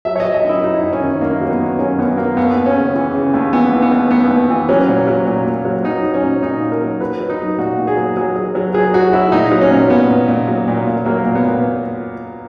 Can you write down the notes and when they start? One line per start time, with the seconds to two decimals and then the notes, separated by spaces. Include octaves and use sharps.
0.05 F#3 E5
0.16 C#5
0.20 D#5
0.25 F#3
0.34 D#5
0.44 F#2 E4
0.64 F#3 D#4
0.83 F#2
0.93 C#4
1.02 D#3
1.21 F#2 A#3
1.41 F#3
1.50 B3
1.60 D#3
1.79 F#3 C#4
1.99 F#2 B3
2.18 F#2 A#3
2.37 D#2 B3
2.57 D#2
2.66 C#4
2.76 C#3
2.96 E3
3.15 C#3
3.34 D#2
3.53 E3 B3
3.73 D#2
3.82 B3
3.92 D#2
4.11 D#2 B3
4.31 D#2
4.50 E3
4.69 F#3 C#4
4.89 A#2
5.07 F#3
5.27 A#2
5.46 A#2
5.65 F#3
5.84 F#3 D#4
6.04 F#3
6.14 C#4
6.23 A#2
6.43 A#2 D#4
6.62 A#2
6.72 A#4
6.81 F#3
7.00 F#3 B4
7.20 F#3
7.29 D#4
7.39 F#3
7.59 A#2 F#4
7.78 A#2
7.87 G#4
7.97 F#3
8.17 F#3 G#4
8.36 F#3
8.55 F#3
8.74 F#3 G#4
8.94 F#3 F#4
9.13 F#3 E4
9.32 A#2 D#4
9.52 F#3
9.61 C#4
9.71 A#2
9.90 A#2 B3
10.09 A#2
10.28 A#2
10.48 F#3
10.68 A#2
10.87 A#2
11.06 F#3 A#3
11.26 A#2
11.35 B3
11.45 A#2